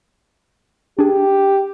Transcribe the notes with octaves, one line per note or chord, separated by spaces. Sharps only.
D4 G4 G#4